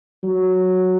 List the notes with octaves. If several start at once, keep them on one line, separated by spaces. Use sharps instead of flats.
F#3